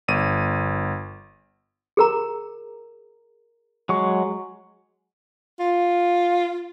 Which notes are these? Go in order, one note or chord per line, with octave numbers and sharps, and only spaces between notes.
G1 D#7
G#4 A#4 A#5
F#3 G#3 C#6
F4